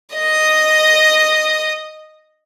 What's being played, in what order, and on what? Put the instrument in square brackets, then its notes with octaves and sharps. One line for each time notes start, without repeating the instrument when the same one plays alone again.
[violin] D#5 D#6